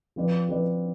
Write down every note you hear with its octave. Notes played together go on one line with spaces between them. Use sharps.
F3 C4 F4 B4 D5
F3 C4 F4 B4 D5